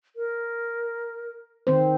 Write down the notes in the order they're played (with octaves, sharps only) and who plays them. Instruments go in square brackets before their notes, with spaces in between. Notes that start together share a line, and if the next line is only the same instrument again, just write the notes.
[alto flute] A#4
[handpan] D#3 C4 C5